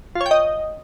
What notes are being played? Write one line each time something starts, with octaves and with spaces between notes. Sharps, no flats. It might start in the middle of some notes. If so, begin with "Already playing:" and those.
F4
C#5
G5
D#5